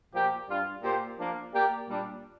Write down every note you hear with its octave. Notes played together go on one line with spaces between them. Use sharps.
A#2 F3 A#3 G4
G2 G3 D4 F4
A#2 A#3 G4 C5
F3 A#3 D4
A#3 G4 D5
A#2 G3 D4